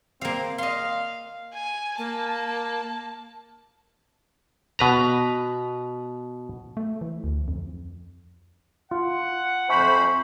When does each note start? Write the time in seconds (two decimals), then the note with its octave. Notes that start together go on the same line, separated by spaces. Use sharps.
0.21 A#3 C4 F5
0.58 D#5 F5 C6
1.54 G#5
1.98 A#3 A5
4.79 B2 B4 A#5
6.77 A3
7.01 E3
7.24 D2
7.48 F2
8.91 F4 F#5
9.69 F2 C5 E5 G#5 B5 C#6